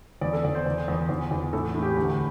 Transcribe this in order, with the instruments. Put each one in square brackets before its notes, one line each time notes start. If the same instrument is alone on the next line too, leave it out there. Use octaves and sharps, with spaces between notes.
[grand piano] E2 D5
A4
E2 D5
C5
E2
E2
E2
E2
A2 A4
A2
G4
D2